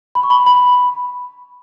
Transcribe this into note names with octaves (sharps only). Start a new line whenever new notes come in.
B5
C#6
B5
B5